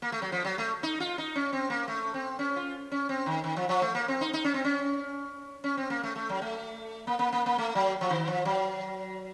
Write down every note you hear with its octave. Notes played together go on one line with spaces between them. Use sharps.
A#3
A3
F#3
F3
F#3
A3
D#4
F4
D#4
C#4
C4
A#3
A3
C4
C#4
F4
C#4
C4
D#3
D#3
F3
F3
A3
A#3
C4
D#4
D#4
C#4
C4
C#4
C#4
C4
A#3
A3
A3
F#3
A3
A#3
A#3
A#3
A#3
A3
F#3
F3
D#3
F3
F#3